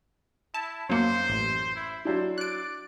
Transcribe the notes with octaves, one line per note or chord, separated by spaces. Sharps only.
E4 A5
F#2 F#3 A#3 C5 C#7
A1
E4
F#3 D4 E4 C5
D5 F#6 D7